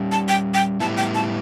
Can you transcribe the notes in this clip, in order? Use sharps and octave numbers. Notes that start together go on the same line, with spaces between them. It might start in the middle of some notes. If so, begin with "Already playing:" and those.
Already playing: G3 C#4 G4 D5
A5
G5
G5
A2 G3 B3 E4 A5
G5
A5